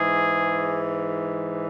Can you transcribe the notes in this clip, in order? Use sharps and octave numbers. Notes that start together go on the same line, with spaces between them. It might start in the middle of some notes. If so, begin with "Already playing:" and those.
Already playing: G#2 E3 G#4